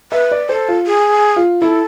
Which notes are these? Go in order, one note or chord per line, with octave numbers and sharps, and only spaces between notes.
B4 E5
D5
A4 C5
F4
G#4
F4
E4 A4